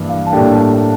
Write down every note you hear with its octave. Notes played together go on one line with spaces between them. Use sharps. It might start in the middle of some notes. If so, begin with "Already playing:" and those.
Already playing: G2 E3 A#3 D4
F5
A5
A2 G3 A#3 D4 G5
A5